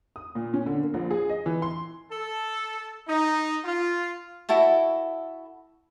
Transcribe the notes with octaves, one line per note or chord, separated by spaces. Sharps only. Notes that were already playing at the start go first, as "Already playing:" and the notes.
D#6
A#2
C#4
D3
A#3
A#1
G#4
D#5
E3
C6
A4
D#4
F4
E4 F#4 A4 E5